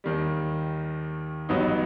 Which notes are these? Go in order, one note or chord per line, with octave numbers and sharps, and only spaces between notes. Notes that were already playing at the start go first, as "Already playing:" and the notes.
D#2 D#3 G3
A1 G2 F#3 B3 D#4